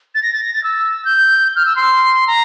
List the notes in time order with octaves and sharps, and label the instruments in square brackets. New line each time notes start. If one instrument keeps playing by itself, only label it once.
[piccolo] A6
A#6
A6
A#6
A6
E6
G6
F6
E6
C6
A#5